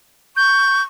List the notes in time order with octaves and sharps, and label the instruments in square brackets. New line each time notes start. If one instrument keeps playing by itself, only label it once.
[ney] C#6 [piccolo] G6